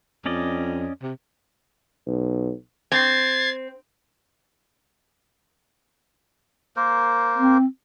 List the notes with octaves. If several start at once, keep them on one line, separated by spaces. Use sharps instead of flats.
F2 C#4 D5 D#5
C3
B1
C4 G#6 A6 C7
A#3 A#4 C5
C4